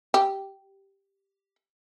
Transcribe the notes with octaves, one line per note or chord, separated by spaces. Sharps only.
G4